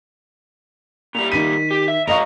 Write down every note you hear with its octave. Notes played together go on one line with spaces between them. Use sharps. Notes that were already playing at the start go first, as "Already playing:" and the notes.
A#2 G3 F7
D#3 B6 D#7
G4
E5
G#2 A#4 D#5 F5 C#6 F7